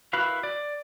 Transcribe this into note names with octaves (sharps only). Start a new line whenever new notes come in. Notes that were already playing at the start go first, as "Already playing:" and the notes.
E4 F#4 A#4 B4 F5
D5